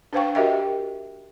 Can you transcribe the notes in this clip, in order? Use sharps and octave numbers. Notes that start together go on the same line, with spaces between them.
D4 B4 C5 F5 G5 C#6
F#4 G4 A#4 D#5 E5 G5